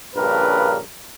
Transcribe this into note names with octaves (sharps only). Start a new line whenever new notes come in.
A#1 G2 C#3 A#4 B4